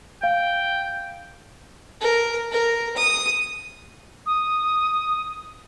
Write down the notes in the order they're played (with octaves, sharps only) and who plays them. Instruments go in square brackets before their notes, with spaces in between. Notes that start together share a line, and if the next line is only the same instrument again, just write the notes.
[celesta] F5 [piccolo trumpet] G5
[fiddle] A#4
A#4
D#6
[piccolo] D#6